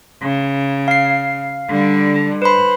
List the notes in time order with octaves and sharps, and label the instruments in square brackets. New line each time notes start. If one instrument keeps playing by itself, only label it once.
[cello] C#3
[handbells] F5 C7
[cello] D3 G3
[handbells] B4 B5 [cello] C5